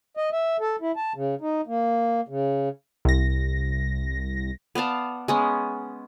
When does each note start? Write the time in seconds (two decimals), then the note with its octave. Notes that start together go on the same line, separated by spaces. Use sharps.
0.17 D#5
0.33 E5
0.60 A4
0.81 E4
0.96 A5
1.15 C#3
1.41 D#4
1.67 A#3
2.29 C#3
3.05 C2 A#6
4.75 B3 D5 F5 A5
5.28 G#3 B3 C#4